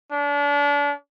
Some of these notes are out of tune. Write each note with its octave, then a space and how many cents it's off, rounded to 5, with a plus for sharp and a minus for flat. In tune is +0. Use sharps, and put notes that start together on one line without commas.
D4 -35